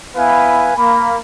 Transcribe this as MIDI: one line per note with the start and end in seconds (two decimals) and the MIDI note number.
0.16 0.72 59
0.16 0.72 64
0.16 0.72 71
0.16 0.72 77
0.16 0.72 80
0.77 1.16 58
0.77 1.16 83